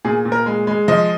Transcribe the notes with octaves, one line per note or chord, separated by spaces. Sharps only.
A#2 G#4
A#2
A#4
G#3
G#3
F3 D#5